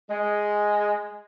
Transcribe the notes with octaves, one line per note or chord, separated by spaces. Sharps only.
G#3